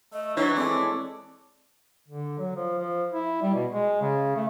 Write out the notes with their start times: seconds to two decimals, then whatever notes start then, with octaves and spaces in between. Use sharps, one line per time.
0.13 A3 D#5
0.37 E3 F#3 D4 C#5
0.56 G#3 C4 A4 D5
2.08 D3
2.38 F#3
2.56 F3
2.79 F3
3.12 E4
3.42 G3
3.55 B2
3.73 G#3
4.01 C#3
4.36 A3